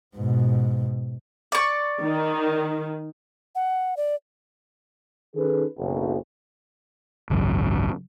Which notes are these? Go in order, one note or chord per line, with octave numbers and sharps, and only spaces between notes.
G#2 B2
D5 C#6
D#3
F#5
D5
D#3 C#4 D#4 G#4 A4 B4
F#1 B1
G#1 C#2 F#2